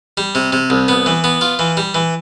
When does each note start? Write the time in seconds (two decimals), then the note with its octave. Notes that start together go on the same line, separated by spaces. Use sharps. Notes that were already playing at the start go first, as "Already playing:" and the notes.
0.17 G3
0.35 C3
0.53 C3
0.70 C2
0.88 B3
1.06 E3
1.24 B3
1.41 F4
1.59 E3
1.77 G3
1.95 E3